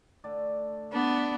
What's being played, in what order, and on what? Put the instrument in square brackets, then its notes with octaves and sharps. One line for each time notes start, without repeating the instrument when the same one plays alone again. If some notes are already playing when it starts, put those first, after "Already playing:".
[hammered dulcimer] D3 A3 D5
[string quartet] B3 D4